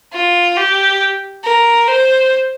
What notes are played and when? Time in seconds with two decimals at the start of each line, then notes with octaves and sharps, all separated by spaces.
0.13 F4
0.57 G4
1.44 A#4
1.88 C5